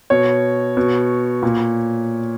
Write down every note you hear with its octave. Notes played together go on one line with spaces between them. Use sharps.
B2 C#5
B2
A#2